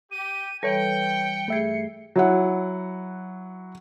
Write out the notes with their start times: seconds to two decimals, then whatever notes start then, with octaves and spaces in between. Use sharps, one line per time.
0.12 G4 D#7
0.63 E3 G3 A4 B4 C#5 G5 C#7
1.48 G2 A3 G#4 E5 C7
2.16 F#3 E4 F#5